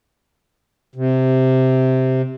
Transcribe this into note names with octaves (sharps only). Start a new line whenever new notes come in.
C3